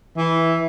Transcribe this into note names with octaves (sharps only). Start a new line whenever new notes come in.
E3